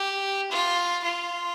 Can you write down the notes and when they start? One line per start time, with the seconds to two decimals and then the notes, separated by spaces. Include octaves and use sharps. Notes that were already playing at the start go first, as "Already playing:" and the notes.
Already playing: G4
0.51 F4
1.04 F4